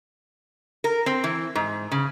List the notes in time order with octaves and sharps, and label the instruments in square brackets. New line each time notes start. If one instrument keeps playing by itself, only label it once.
[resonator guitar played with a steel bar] A#4
C4
E3
G#2
C#3